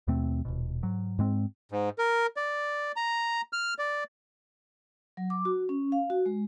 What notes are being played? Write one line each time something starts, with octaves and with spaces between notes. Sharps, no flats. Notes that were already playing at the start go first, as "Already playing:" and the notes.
D#2 B2 A3 C4
D#1 G#1 B2
G#2 F#3
G#2 G#3 C4
G#2
A#4
D5
A#5
F6
D5
F#3
D6
F#4
C#4
F5
F#4
G#3